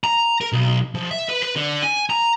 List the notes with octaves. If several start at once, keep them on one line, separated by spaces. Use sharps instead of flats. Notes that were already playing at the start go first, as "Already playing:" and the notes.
A#5
A#4
B1
F3
E5
B4
B4
D3
G#5
A#5